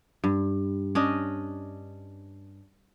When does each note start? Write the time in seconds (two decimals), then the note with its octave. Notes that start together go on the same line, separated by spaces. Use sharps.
0.24 G2
0.95 C#4 D4 D#5